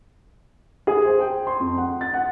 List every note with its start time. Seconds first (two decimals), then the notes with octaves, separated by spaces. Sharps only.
0.87 G#4
1.05 C5
1.20 G5
1.47 C6
1.60 F2
1.77 F#5
2.01 A6
2.14 F#5